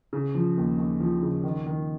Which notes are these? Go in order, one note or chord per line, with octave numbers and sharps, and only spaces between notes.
C#3
F3
D#2
D#2
F3
C#3
D#3
D#3